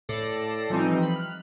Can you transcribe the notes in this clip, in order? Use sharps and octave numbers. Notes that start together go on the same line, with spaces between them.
A2 A4 D5 A#6 C7
E3 F3 G3 C4 D#4
B5
F6 F#6